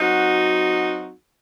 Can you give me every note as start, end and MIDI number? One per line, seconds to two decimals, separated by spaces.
0.01 1.12 54
0.01 1.12 60
0.01 1.12 63
0.01 1.12 66